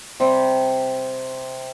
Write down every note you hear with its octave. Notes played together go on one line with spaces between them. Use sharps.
C3 G3 C4